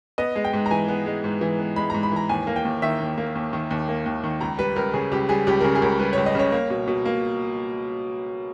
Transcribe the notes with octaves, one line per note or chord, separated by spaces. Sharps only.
B3 D#5
G#3
G5
G#2
A#5
E3 G#5
B3
G#3
G#2
E3
B3
G#3 B5
G#2 A#5
B5
E3 A#5
D#2 G#5
A#3
G5
D#2
D#3 E5
D#2
A#3
D#2
D#3
D#2
A#3
D#2
D#3
C#2 A#5
G3 B4
C#2 A#4
C#3 G#4
C#2 G4
G3 G#4
C#2 G4
A#4
C#3 G#4
G#4
C#2 A#4
G3 B4
C#2 C#5
D#5
C#3 C#5
A#3
B2
B2
A#3